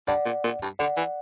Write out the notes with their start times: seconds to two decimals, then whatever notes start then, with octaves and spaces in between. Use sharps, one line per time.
0.07 G2 D5 F#5
0.25 A#2
0.44 A#2
0.62 G2
0.79 D3 D5 F#5
0.97 E3